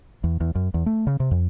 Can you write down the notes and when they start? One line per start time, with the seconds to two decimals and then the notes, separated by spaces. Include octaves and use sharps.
0.24 E2
0.40 E2
0.55 F#2
0.74 E2
0.86 A3
1.07 C#3
1.20 C3
1.31 F2